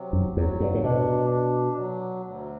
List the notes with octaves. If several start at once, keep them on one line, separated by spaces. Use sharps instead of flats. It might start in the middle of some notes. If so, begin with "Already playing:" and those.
Already playing: C3 F#3
F#2
E2 F#3
G2
A2
B2 D4
D4
F#3
D2